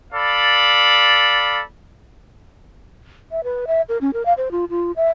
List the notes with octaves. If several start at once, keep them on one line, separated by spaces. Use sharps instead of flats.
A4 D5 F5 B5
E5
B4
E5
A#4
C#4
A#4
F5
C5
F4
F4
E5